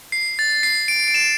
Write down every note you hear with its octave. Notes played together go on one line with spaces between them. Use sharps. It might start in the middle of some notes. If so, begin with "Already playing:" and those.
C7
A6
C7
D7
D7
E7